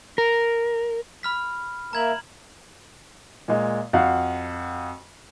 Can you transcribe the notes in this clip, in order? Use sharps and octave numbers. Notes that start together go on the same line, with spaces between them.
A#4
B5 F6 B6
A#3 A#4 E5 A#5 G#6 F#7
A#2 G#3
F2 F#4 F5 F#5